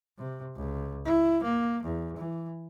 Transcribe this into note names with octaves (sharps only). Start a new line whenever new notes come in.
C3
C#2
E4
A#3
E2
E3